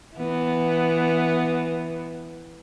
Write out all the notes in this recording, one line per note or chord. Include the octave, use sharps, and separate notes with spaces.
E3 B3